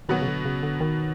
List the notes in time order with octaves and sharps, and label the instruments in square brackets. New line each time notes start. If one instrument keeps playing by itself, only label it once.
[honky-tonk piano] B2 F#3 B3 [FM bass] D#3
[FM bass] C#3
D3
C#3
D3
D#3